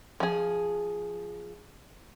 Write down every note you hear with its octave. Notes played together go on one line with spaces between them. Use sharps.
F3 G#4